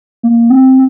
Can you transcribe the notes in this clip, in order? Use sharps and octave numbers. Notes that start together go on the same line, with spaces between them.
A#3
C4